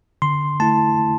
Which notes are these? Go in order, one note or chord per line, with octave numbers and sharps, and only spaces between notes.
D3 C6
A3 E4 A5